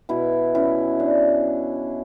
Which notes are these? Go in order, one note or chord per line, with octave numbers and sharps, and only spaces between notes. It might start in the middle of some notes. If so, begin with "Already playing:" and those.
B2 E4
C#4 E4
D4